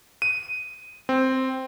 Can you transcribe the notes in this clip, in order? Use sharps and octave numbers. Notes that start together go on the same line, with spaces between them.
D#7
C4